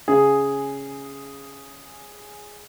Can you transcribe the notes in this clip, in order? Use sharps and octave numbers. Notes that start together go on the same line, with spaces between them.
C#3 G#4